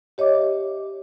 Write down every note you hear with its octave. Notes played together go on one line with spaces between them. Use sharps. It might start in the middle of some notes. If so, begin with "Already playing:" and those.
G4 C#5 D#5 E5 D6